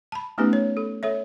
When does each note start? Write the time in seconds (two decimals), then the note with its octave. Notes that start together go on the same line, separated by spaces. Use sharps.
0.12 A5 B5
0.38 A3 B3 C#4 D#4 G4 B4
0.53 C#5
0.77 A4
1.03 A4 C#5 E5